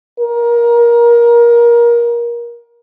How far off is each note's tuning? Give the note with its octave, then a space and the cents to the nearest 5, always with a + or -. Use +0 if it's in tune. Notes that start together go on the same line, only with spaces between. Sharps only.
A#4 +20